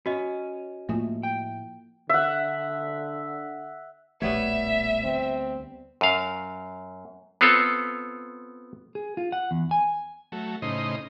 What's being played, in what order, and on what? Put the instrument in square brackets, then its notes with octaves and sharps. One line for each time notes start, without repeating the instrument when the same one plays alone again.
[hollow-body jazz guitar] C#4 [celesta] F#4 D#5
[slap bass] A2 F3 A3 [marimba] A#3 F4
[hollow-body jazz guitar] G5
[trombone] D3 [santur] E5 F#5
[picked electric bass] D1 A#1 A3 [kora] G3 B3 C#5 [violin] E5
[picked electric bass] D2 [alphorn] C4
[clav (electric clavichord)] F#2 F5
B3 C4 F4 A4 C#5
[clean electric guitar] G#4
F4
F#5
E2
G#5
[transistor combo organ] F#3 A3
A2 C#3 D#4 C5 D#5